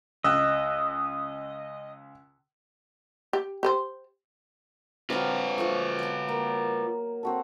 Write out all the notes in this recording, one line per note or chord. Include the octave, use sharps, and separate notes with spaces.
C#2 D#5 E6 F#6
G4
G4 B4 C5
F#3 C4 F4 B4 F5 G5
F3 A3 A#3 C#6
B3 A5
A#3 G5
C4 F#4 A4